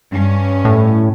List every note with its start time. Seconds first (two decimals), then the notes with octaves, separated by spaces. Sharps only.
0.12 G2 C#4
0.65 A2